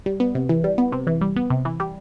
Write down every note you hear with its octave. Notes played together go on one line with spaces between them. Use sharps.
G3
B3
C3
E3
G3
B3
C3
E3
G3
B3
C3
E3
G3